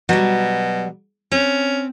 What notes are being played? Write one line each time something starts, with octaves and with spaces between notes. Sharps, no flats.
B2 F#3 G3
C4 C#4